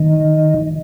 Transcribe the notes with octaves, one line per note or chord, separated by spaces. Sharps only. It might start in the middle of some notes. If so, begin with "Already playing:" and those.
Already playing: D#3